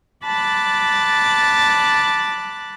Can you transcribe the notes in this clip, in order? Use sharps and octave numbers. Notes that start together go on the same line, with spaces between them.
A5 B5 D6 F#6 A6